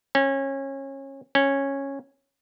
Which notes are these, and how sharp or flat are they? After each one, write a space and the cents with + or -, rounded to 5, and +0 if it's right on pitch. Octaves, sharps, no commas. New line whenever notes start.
C#4 -25
C#4 -10